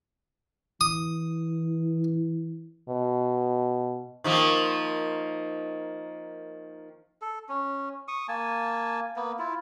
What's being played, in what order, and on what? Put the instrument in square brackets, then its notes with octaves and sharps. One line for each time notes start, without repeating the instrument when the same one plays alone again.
[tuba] E3 [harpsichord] D#6
[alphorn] B2
[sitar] D#3 F3 A#3
[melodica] A4
C#4
C#6 D#6
A#3 G#5 A5
A#3 B3
E4 F4